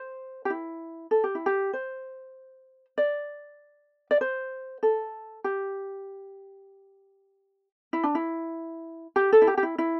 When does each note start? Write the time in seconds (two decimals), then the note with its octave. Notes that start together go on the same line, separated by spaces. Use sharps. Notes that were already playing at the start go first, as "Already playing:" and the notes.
Already playing: C5
0.45 G4
0.50 E4
1.11 A4
1.24 G4
1.35 E4
1.46 G4
1.73 C5
2.98 D5
4.11 D5
4.21 C5
4.83 A4
5.44 G4
7.93 E4
8.03 D4
8.15 E4
9.16 G4
9.33 A4
9.42 E4
9.47 G4
9.57 G4
9.63 E4
9.78 E4